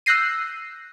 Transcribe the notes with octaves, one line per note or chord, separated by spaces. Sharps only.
E6 F#6 G6 A#6 C7 D#7